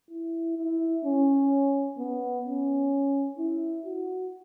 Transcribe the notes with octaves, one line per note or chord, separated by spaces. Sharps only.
E4
E4
C#4
B3
C#4
E4
F#4